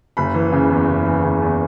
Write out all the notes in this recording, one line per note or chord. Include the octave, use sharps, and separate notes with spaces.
F#1 B5
E3
C#3
E2
F#1
E3
C#3
E2